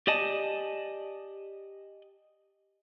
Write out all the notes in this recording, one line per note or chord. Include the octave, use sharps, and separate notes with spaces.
G4 D5 D#5 G#5 A5